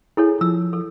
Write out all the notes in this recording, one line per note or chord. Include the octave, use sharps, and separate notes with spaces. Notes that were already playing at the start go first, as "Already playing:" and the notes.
E4 G#4 A4 C#5
F3 E6
A4